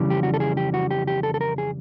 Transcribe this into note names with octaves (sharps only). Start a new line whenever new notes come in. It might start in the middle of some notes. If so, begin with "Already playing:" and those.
Already playing: F2 C#3 E3 G3
G4
F#4
A4
G#4
G4
F#4
G4
G4
A4
A4
A#4
G#4